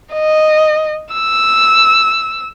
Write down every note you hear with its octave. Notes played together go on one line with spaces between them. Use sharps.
D#5
E6